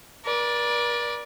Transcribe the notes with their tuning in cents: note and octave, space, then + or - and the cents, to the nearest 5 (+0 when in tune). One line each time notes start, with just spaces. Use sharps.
A#4 +45 D5 +0